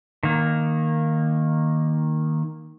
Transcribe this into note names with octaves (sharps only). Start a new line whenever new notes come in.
D#3 A#3